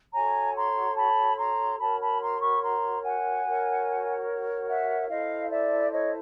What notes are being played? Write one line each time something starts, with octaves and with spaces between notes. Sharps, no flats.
F#4 A4 C#5 G#5 A#5
A#5 C6
A5 B5
A#5 C6
F#4 A#4 C#5 A5 B5
A5 B5
A#5 C6
B5 C#6
A#5 C6
F#5 G#5
F#4 A#4 C#5
E5 F#5
E4 A4 C5 D#5 F5
D5 E5
C#5 D#5